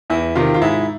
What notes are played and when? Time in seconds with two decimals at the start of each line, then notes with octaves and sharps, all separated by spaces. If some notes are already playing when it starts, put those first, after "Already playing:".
0.10 E2 E4
0.35 C3 D#3 F4
0.54 F4
0.62 G#2 E4